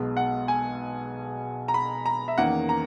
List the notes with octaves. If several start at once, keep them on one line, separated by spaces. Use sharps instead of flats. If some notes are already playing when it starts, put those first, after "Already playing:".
Already playing: B1 B2 G#3 B3
F#5
G#5
A#5
B5
A#5
E5
E2 D#3 A#3 C#4 F#5
A#5